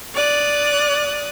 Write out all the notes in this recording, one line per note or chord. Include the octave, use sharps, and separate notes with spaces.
D5 D#6 F#6